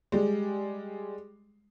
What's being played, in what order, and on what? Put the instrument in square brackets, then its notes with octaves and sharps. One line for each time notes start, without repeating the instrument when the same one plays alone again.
[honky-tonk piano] G3 G#3